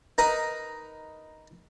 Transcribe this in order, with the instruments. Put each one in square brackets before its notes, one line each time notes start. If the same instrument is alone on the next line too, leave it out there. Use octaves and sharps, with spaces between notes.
[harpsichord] D#4 A#4 B4 A#5 D#6